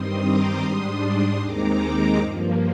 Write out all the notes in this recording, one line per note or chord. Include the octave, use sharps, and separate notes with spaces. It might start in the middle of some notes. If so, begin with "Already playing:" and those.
Already playing: G2 D#3 G3 C4 C6 D#6
A#5 D6
G#2 G3 D4 C6 D#6
D#2 D#3 G#3 C4 D#4 A#5 D6
A#5 D6
G2 F3 A#3